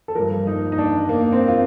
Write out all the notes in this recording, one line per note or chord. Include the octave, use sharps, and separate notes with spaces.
A4
G2 F3 A#4
D#4
D#4
D4
A#3
C4
F4